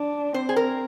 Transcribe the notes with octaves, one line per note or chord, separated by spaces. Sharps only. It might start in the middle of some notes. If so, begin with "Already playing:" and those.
Already playing: D4
C4 C5
G#4
A#4